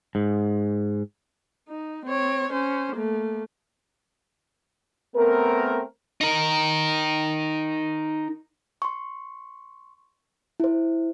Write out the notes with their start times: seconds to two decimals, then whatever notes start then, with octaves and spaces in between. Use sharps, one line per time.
0.15 G#2
1.68 D#4
2.05 C4 C#5
2.52 C#4 C5
2.95 A3 A#3
5.16 A3 B3 C4 A#4
6.21 D#4 A#4
8.82 C6 C#6
10.60 E4 C5